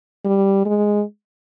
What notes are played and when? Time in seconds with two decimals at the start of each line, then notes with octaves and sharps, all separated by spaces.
0.25 G3
0.66 G#3